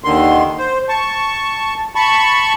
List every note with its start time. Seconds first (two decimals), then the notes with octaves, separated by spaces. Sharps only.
0.04 D#2 D3 D#3 C6
0.58 C5
0.89 A5 C#6
1.95 A5 B5 C#6